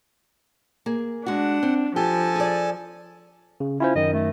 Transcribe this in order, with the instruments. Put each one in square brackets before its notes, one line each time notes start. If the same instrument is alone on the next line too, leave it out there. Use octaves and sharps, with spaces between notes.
[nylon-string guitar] A#3 G#4
[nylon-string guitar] G#3 F#4 [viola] D4 [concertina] F#5
[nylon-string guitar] C4
[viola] F3 [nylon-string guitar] G4 [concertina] A4 G#5 A5
[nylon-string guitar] G#4 D5
[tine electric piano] C#3
[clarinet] C#4 [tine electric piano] E4 F4 C5
[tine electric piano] F#2 D#3 [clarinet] D#5
[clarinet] A3